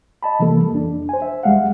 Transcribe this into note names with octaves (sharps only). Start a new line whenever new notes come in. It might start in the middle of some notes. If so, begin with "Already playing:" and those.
D#5 A5 B5
C3 E3 G3 A#3 A4
F2 D4
C5 G#5
E5
D#2 G3 G#3 F5 F#5